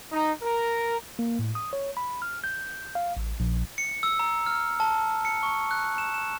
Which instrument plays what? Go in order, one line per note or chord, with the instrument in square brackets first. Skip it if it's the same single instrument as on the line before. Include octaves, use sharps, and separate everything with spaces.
[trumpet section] D#4
A#4
[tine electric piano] A#3
A2
D#6
C#5
B5
F6
G6
F5
A1
A#1
[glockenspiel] C#7
E6
A#5
F6
A5
C#7
C#6
F#6
E7
E7